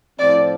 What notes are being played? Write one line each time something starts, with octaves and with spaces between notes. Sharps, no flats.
A2 F3 C4 D5